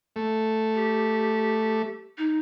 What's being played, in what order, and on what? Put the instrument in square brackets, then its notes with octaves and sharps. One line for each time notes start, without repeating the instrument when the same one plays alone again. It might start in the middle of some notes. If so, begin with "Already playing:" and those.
[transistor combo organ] A3
[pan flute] G4
D#4